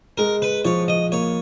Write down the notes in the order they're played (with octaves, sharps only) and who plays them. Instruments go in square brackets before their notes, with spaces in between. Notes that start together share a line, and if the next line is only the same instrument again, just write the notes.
[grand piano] G#3 [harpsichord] A#4
[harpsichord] B4
[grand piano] F3 [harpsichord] C#5
[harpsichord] D#5
[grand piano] A#3 [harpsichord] C#5